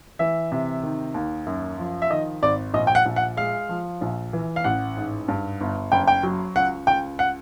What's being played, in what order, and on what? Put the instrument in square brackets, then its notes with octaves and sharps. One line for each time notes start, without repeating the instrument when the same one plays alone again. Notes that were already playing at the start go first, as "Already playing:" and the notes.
[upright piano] E3 E5
C3
D#3
D#2
F#2
F3
E5
D#3 D#5
G#1 D5
A#1 D#5
G5
F#5
A#1
F#5
G#3 F5
F3
A#1
E3
F5
A1 F#5
G#2
G2
G1
F#1 G5
G5
F#3
C#2 F#5
C#2 G5
F#5